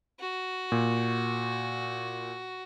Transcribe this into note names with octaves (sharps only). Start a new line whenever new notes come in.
F#4
A#2